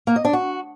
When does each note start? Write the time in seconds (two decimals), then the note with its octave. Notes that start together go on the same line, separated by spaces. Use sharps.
0.07 A#3
0.16 D#5
0.25 D4
0.33 F#4